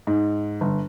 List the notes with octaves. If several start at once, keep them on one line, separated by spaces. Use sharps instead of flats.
G#2
G1